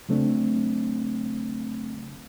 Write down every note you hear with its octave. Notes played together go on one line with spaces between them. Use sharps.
C#3 F#3 A3 C4 D4